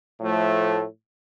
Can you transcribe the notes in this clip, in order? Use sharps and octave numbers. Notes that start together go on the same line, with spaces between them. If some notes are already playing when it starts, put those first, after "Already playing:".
A2 F3 A3